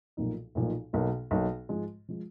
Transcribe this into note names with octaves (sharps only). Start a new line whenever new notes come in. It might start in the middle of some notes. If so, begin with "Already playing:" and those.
B1 A#2 F3 A#3 D#4
B1 A#2 F3 A#3 D#4
B1 B2 F#3 A#3
B1 B2 F#3 A#3
G#2 F3 G#3
F3 G#3